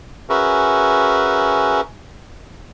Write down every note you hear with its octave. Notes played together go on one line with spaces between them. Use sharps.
C#4 F#4 G#4 A#4 B4 E5